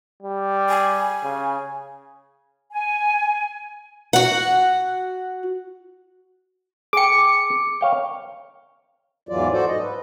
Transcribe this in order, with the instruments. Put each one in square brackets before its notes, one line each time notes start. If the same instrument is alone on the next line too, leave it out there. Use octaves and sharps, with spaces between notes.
[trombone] G3
[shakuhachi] G#5
[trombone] C#3
[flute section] G#5
[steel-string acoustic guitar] F#4 F#5
[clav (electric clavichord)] G#4 G5 [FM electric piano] D6 C#7
[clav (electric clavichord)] C#5 F5 G5
[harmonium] E2 G#2 E3 F#3 F4 D5
F#4 A4 C5 D5
G#2 D#5
B4